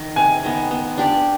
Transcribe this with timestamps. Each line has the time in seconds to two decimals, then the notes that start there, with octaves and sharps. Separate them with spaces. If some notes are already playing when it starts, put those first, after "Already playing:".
Already playing: D#3
0.16 C3 G#5
0.44 D#3 B3
0.71 B3
0.98 D4 G4 D5